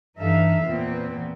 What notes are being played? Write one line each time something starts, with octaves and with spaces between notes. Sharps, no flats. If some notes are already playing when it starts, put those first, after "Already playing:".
G2 E3 D#4 A4 E5 F5
E2 A#2 B3 C4